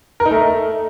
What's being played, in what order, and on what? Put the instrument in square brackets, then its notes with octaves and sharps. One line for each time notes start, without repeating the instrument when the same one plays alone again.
[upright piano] A#4
D#4
A3